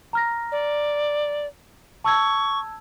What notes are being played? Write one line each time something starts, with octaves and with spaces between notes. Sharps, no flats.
A#5 F6 A#6
D5
A5 C#6 E6 G#6